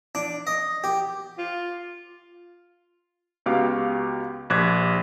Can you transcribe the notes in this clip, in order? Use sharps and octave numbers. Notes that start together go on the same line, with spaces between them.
D4
D#5
G4
F4
C#2 B3 F#4 G4 F5 D6
A#1 G4 D6 F#6 G#6